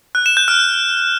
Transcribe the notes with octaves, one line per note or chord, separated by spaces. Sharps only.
F#6
E7
G6
F6